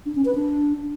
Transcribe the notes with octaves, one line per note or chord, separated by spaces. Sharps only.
D4
C#4
B4
D4